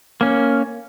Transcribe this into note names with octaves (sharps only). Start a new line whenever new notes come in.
A#3 C#4